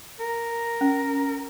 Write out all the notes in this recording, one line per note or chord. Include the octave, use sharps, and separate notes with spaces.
A#4
C#4